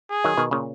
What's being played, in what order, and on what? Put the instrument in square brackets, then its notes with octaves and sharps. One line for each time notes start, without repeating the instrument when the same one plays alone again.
[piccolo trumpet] G#4
[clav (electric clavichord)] D#3 F#3
B2 D#3
A#2 C#3